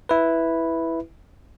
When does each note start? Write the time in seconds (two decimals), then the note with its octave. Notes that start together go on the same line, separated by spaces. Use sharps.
0.09 E4 B4